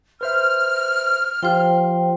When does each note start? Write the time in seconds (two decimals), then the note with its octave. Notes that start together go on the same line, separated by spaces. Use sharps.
0.21 B4 C5 E5 F6
1.43 F3 F4 G4 C5 G5